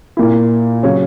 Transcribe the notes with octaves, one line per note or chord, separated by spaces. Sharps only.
A#2 A#3 E4
C#3 F#3 C#4